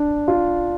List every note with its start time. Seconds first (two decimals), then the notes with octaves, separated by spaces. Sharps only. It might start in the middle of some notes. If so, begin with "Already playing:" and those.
Already playing: D4
0.28 F4